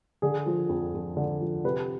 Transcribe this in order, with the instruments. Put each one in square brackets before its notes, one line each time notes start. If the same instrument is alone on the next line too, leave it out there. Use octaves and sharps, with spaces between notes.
[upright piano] D3 G#4
F3
F2
F2
D3
F3
C3 B4